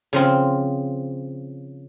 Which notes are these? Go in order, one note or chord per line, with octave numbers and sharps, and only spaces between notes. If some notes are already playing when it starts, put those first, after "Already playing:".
C#3 F3 C4